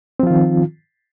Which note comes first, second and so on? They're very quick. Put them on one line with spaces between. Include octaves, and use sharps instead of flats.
C4 F3 F4 D#3